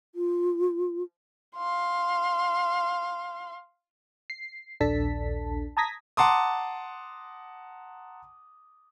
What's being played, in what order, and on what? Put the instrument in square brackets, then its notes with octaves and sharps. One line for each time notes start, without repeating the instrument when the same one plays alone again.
[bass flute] F4
[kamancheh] F5 C6
[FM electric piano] C7
A#1 D#2 D4 A4 A5 B6
A5 A#5 D#6 G#6 A#6 B6
[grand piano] F#5 A5 A#5 C6 D6 D#6